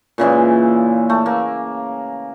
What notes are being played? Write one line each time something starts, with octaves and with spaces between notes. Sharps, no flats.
A#2 C#3 E3 G#3
A3
A#3